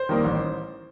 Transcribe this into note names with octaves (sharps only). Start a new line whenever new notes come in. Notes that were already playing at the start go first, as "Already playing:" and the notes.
Already playing: C5
D#3 G3 A#3
A1